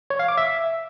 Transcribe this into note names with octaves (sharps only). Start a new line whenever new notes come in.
C#5
F5
D6
E5